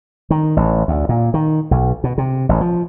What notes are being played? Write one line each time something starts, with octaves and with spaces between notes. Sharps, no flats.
D#3
A1
D2
A#2
D#3
B1
B2
C3
A1
F3